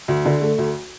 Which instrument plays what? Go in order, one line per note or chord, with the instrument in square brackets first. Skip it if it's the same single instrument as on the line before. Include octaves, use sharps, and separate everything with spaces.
[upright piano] D2
D3
A3
D2